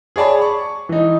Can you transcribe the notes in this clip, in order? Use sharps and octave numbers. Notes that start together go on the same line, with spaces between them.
G#4 C#5 D5 A5 B5
C#6
E3 D#4